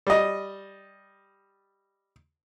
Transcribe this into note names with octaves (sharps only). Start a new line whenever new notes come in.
G3 D#5